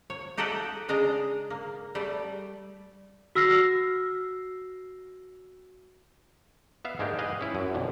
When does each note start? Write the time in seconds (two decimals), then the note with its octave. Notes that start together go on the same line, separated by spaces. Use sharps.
0.10 C#5
0.37 D#4 G4 A4 D#5 E5 F#5
0.88 C#3 G#3 D4 D#5 A#5
1.50 A#3
1.95 G3 A3
3.35 F#4 E6 F6 A#6 C7
6.85 B3 E5 F5
6.99 G#2 G#3 A#3 D4 G4
7.19 B4 D#5 F5 G#5
7.41 C#4 E4
7.55 F#2
7.74 B1 F2 D3